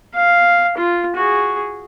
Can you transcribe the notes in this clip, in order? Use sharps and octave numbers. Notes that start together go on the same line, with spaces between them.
F5
F4
F#4 G#4